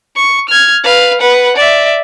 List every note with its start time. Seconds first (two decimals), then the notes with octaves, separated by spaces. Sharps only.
0.16 C#6
0.49 F6 G#6
0.84 B4 F5
1.20 B4 F#5
1.56 D5 E5